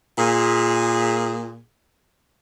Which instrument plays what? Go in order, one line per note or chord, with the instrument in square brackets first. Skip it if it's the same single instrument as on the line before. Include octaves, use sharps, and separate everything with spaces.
[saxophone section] A#2 G#4